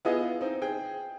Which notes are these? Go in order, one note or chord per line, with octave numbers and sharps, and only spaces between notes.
B3 E4 F4 G#4 D#5
C4 D#4
G#4 G5